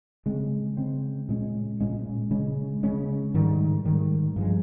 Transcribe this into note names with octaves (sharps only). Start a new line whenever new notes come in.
C#3 G#3 C4
C#3 G#3 C4
A#2 G#3 C#4
A#2 G#3 C#4
C#3 G#3 C#4
C#3 G#3 C#4
G#2 D#3 G3
G#2 D#3 G3
G2 F3 G#3